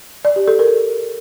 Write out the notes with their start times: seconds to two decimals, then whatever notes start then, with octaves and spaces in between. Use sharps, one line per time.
0.25 D5
0.36 G4
0.48 A4
0.59 A#4